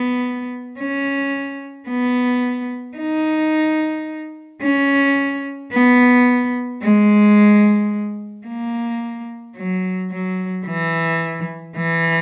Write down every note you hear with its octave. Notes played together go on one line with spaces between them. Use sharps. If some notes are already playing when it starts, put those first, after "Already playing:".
Already playing: B3
C#4
B3
D#4
C#4
B3
G#3
A#3
F#3
F#3
E3
E3